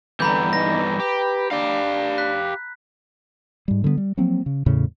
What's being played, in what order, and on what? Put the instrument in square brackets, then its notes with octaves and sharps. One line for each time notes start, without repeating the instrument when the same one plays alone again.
[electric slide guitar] E2 G2 E3 [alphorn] D3 [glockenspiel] A#5 B5 G6
[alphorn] D#4 [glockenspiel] A#6
[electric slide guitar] G4 [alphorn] B4
[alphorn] D4 [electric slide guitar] G4 F5
[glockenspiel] F#6 B6
[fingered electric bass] G#2 G3
D3 G3 A3 B3
G3
F3 F#3 A#3 C4
C#3
E2 A2 C#3